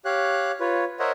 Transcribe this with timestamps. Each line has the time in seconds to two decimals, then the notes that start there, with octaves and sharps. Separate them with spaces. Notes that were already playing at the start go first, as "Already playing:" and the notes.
0.05 G4 C#5 F5 F#6
0.60 F4 B4 C#5
0.99 A#4 C5 C#5 D#5 E5 F#5